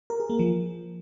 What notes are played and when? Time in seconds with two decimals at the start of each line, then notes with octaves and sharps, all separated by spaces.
0.10 A#4
0.20 G#4
0.30 A#3
0.39 F3